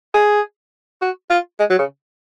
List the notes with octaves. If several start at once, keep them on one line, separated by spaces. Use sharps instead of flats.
G#4
F#4
F4
G#3
F#3
C#3